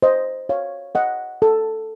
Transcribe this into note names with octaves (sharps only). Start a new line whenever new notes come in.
C5 D#5
C#5 F5
D#5 F#5
A4